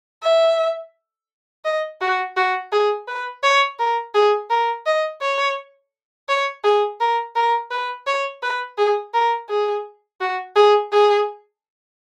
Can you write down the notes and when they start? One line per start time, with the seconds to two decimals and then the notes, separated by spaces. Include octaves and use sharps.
0.23 E5
1.65 D#5
2.01 F#4
2.37 F#4
2.72 G#4
3.08 B4
3.43 C#5
3.79 A#4
4.14 G#4
4.50 A#4
4.86 D#5
5.21 C#5
6.29 C#5
6.64 G#4
7.00 A#4
7.35 A#4
7.71 B4
8.07 C#5
8.43 B4
8.78 G#4
9.14 A#4
9.49 G#4
10.21 F#4
10.56 G#4
10.92 G#4